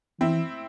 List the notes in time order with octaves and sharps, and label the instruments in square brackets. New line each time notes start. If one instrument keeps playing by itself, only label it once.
[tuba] E3 [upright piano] C4 E4